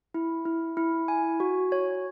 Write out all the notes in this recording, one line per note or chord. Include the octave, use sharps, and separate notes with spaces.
E4
E4
E4
G#5
F#4
C#5